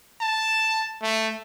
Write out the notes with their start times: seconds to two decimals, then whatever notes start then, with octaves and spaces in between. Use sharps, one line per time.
0.21 A5
1.02 A3